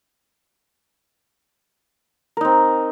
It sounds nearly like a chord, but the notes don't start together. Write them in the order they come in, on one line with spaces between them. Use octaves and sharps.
A#4 D#4 C4